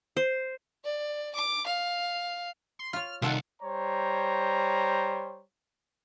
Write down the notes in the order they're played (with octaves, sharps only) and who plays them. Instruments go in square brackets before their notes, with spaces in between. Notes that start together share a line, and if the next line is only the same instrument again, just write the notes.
[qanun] C5
[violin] D5
D6
F5
[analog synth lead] C6
[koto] F4 C#5 [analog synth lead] F6
[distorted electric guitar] C2 [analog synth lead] D#3 [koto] F4 A4 F#5
[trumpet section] G3 C5 C#5 A#5